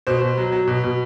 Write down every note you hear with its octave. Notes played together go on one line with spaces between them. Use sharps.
B2 C5
B2
F#3
F#3
B2
B2